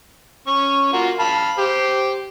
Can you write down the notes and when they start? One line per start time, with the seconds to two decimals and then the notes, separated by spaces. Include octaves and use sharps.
0.47 C#4 C#6
0.93 A#3 F4 F#4
1.19 F5 A5 B5
1.58 G4 C5